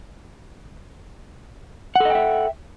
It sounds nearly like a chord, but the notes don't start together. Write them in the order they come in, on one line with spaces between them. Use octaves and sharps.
F#5 A4 D#5 G5 E5